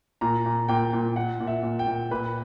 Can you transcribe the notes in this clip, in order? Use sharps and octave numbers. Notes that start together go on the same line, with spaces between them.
A#2 A#5
A#2
A#2 G5
A#2
A#2 F#5
A#2
E5
A#2
G5
A#2
A#2 B4